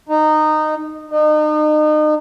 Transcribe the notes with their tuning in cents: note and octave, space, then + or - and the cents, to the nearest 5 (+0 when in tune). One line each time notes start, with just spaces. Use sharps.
D#4 -15
D#4 -35